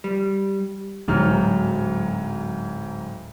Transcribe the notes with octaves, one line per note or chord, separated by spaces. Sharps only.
G3
D1 G#2 F#3 F6